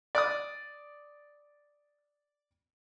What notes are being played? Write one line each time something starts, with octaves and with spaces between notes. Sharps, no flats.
D5 D6 D#6